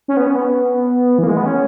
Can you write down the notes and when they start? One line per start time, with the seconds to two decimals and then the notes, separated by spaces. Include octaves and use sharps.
0.08 C#4
0.17 B3
0.27 C#4
0.36 B3
1.18 E3
1.23 A#3
1.28 G#3
1.37 B3
1.46 C#4